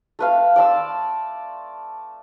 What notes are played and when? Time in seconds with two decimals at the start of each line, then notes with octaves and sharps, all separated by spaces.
0.19 A3 B4 F5
0.56 D5 A5 C6 E6